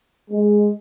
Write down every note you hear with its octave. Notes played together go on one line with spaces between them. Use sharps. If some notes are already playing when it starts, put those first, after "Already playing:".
G#3